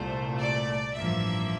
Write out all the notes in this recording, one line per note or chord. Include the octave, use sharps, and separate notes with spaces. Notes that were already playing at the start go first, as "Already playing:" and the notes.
Already playing: C2 A#2 A3 C5
D5
A1 G2 F3 A#3 E5